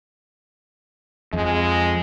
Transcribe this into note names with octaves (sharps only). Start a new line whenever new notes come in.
F2 G#3